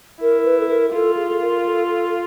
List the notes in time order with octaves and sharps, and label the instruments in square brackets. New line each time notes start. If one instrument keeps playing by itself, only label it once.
[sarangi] E4 [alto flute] A#4
[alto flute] B4
A4
A#4
[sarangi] F4 [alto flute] A4
[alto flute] G#4
A4
A#4
A4
A4
A4